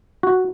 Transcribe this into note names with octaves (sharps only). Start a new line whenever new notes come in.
F#4